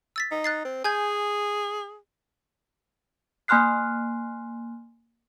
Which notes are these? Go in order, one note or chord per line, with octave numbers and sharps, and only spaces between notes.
E6 A6 B6
D#4
F#6 A6 C7
C4
G#4 G#5 G6 G#6
A#3 G#5 C6 F6 F#6 C7